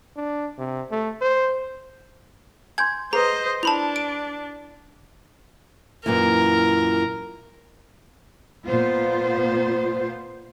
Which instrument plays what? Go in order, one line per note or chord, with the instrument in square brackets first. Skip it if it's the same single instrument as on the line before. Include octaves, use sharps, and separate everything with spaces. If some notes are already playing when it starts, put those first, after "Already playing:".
[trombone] D4
C3
A3
C5
[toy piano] G#5 C6 [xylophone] G6 G#6
[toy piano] G#4 B4 [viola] C5 D#5 [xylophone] A#5
[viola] D4 [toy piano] E4 [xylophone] A5 B5 F7
[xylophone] D7
[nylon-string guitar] F#2 A#2 E3 [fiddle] A#4
[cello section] A#2 B3 F4 C5